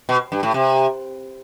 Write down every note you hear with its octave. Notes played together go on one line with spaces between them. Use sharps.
B2
G2
A2
C3